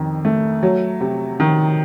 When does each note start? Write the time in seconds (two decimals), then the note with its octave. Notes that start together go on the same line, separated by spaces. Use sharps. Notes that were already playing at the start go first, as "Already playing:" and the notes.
Already playing: F2 D#3
0.25 A3
0.63 F#3
1.01 C3
1.40 D#3